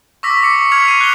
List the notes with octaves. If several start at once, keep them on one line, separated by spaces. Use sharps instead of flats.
C#6 D6 E6 A#6 B6
D6 C#7
C#6
F6 G#6 B6 C#7 F7
C7 D#7
F#6 G7